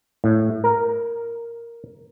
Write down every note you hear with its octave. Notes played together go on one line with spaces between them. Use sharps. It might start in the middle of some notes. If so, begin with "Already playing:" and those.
A2
A#4